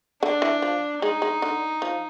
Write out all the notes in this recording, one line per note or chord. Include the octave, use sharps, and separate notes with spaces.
D3 D4
E3
F3
G#3 D#4
G#3
D3
F3